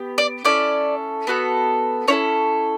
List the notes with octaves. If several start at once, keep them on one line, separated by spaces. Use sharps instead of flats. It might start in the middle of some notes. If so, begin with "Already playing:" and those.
Already playing: B3 G4
D5
C#4 E4 A4 D5
B3 F#4 A4
C#4 E4 A4 C#5